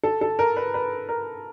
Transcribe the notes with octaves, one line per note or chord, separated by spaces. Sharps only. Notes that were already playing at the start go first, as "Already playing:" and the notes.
A4
A4
A#4
B4
B4
A#4